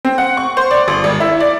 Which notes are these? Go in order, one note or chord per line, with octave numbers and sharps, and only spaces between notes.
C4
F#5
C#6
C5
D5
G1
G#1
E4
D5